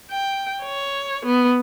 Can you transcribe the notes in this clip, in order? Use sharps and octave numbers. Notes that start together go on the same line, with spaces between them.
G5
C#5
B3